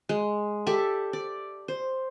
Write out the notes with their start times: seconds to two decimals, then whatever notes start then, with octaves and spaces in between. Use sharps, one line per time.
0.09 G#3
0.67 G4 A4 D5 E5
1.13 D5
1.68 C5